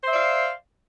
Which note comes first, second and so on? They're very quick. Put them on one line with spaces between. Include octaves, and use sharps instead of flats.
C5 E5 D5 F5